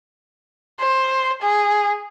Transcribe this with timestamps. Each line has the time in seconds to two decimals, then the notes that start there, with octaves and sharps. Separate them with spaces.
0.80 C5
1.42 G#4